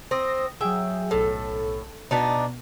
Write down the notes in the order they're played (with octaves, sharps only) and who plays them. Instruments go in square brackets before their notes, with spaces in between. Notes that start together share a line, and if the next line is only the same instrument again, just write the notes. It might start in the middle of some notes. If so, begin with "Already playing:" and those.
[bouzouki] C4 [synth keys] D#6 A#6
[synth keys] F#3 G#4 [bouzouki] E5 G5
[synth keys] B1 A4 [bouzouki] A2
[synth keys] B2 [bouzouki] B3 D4 D#4